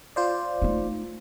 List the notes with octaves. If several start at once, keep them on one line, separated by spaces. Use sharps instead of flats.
F4 C5 D5
A3 D#4